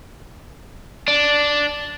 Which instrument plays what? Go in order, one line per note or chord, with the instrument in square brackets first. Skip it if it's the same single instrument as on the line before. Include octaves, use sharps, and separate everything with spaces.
[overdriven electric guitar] D4